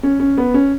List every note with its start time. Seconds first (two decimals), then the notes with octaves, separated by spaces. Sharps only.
0.03 C#4
0.20 C#4
0.37 B3
0.54 C#4